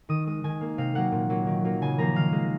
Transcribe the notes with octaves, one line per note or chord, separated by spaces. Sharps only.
D#3 D#6
G#3 D#6
D#3 G#5
A#3
C3 F5
F#3 A#3 F#5
A#2
F#3 A#3
D#3
F#3 A#3
C#3 G#5
F3 A#3 A#5
D#3 F5
G#3